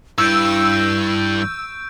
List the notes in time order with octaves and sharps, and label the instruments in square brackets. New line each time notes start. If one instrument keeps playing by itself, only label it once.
[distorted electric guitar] G2 [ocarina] E4 [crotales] C#6 G6 D7 [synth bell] E6